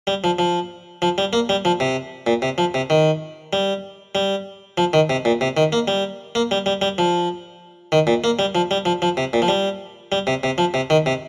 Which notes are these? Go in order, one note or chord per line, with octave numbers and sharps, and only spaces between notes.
G3
F3
F3
F3
G3
A#3
G3
F3
C3
A#2
C3
F3
C3
D#3
G3
G3
F3
D#3
C3
A#2
C3
D#3
A#3
G3
A#3
G3
G3
G3
F3
D#3
A#2
A#3
G3
F3
G3
F3
F3
C3
A#2
F3
G3
G3
C3
C3
F3
C3
D#3
C3